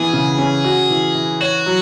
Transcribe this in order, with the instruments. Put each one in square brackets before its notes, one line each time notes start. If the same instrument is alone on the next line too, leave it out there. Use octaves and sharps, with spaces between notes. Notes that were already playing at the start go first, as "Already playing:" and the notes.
Already playing: [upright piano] E3 B3 [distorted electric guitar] G#4
[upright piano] C#3
C#4
F#4
E3
E3
[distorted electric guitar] F#4 [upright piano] C#5
[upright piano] F#3